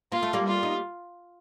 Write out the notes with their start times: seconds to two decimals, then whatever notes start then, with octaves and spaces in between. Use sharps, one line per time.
0.12 A#3 F4
0.23 A3
0.33 G3 A#3
0.48 F4
0.63 D#4